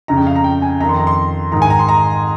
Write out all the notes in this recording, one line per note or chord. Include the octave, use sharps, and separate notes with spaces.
F2 C#3 A#5
G5
F5
A#5
G5
G#5
F2 D#3 A#5
C6
A#5
C6
G#2 D#3 A#5
G#5
A#5
C6
A#5